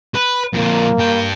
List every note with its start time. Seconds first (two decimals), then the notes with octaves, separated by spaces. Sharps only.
0.15 B4
0.54 F2 A#2 A#3
0.99 G2 G5